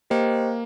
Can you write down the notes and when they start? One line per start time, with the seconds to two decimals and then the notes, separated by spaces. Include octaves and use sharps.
0.10 A#3 G4 C5 D#5 G5